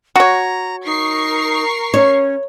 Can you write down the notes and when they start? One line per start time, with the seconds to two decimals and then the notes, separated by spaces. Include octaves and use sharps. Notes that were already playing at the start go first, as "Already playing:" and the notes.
0.16 F#4 C#5 A#5
0.86 D#4 A#4 C#6 C7
1.94 C#4 C#5